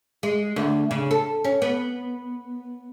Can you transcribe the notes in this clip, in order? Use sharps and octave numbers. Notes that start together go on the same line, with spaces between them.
G#3
D2
C#3
A4
C#4
B3